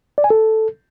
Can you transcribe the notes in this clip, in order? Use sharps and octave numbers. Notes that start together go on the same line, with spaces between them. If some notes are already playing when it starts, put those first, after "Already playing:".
D5
G#5
A4